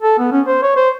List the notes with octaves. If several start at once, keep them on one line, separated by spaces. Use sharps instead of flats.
A4
B3
C#4
C5
C#5
C5